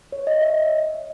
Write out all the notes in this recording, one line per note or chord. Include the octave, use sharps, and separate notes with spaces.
C#5
D#5
E5